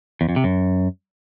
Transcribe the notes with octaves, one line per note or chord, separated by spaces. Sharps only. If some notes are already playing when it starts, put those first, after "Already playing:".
E2
F2
C3
F#2